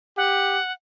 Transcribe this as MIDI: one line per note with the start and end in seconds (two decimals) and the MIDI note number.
0.17 0.59 67
0.17 0.72 78